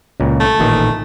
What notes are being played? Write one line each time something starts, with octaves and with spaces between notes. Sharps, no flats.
C#2 A#2
A3
A1 A#2 D#3